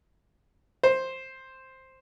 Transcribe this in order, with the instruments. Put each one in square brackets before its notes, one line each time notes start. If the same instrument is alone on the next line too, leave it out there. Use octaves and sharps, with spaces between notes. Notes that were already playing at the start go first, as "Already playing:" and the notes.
[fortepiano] C5